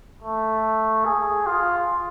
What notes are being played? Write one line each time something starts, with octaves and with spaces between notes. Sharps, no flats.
A3
G#4
F4